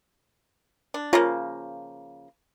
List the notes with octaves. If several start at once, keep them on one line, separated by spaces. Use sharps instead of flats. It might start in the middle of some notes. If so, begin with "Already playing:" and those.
D4
C#3 F3 A#3 F4 C#5 A#5